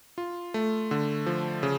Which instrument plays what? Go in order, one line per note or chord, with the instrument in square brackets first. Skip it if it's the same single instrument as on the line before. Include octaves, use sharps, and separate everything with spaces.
[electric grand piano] F4
A3
D3
F3
C#3